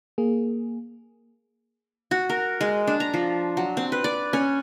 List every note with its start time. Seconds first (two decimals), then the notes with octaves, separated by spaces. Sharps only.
0.18 A#3 G#4
2.11 F#4
2.29 A#4
2.61 G#3
2.87 D4
3.00 A#5
3.14 F3
3.57 F#3
3.77 C4
3.92 B4
4.04 D5
4.33 C#4